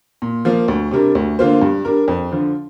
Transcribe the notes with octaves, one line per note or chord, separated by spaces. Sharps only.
A#2
F3 A#3
D2
C3 G3 D4 A#4
D2
D3 A#3 F4 C5
G2
G3 D4 A#4
F2
D3 F3